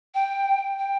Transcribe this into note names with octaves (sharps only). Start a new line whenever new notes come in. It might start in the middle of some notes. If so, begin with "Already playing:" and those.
G5
G5